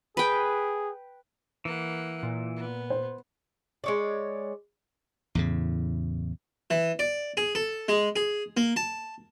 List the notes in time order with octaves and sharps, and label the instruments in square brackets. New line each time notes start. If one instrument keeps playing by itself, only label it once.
[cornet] G#4 [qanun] B4 G5
[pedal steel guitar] E3 [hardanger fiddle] A#3 F#5
[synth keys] A#2
[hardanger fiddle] B3
[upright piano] C5
[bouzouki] G#3 C#5 D5
[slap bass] E2 A2 C#3
[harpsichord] E3
D5
G#4
A4
G#3
G#4
A#3
A5